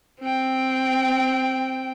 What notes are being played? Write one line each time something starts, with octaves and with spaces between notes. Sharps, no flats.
C4 G5